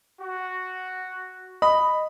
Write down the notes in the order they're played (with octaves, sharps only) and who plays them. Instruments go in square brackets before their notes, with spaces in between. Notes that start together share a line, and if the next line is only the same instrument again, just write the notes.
[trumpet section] F#4
[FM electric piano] D#5 [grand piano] B5